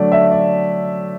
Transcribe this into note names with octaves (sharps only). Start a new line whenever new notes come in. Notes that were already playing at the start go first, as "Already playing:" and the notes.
Already playing: D3 F#3 A3 D5
E5
D5